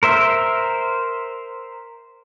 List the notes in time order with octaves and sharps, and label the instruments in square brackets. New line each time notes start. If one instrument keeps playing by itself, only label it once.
[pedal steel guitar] A#4 C5 E5